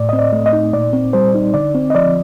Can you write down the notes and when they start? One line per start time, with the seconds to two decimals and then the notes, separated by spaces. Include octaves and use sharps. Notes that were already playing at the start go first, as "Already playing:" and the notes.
Already playing: A2 D5
0.09 C4 D#5
0.19 D5
0.33 A3
0.46 D#5
0.53 D#4
0.73 A#2 D5
0.93 C4
1.13 G3 C5
1.34 D#4
1.54 D3 D5
1.75 C4
1.90 D#5
1.95 F3 D5